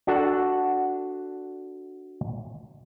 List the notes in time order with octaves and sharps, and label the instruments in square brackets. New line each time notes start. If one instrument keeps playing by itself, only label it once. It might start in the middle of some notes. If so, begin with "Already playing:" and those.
[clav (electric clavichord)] D4 F#4 A4 F#5 A5